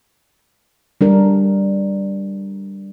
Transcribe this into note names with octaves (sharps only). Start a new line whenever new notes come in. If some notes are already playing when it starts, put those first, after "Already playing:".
G3 D4 A#4